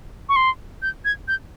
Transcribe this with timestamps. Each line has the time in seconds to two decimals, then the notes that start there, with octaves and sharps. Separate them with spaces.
0.29 C#6
0.36 C6
0.82 G6
1.05 G#6
1.28 G6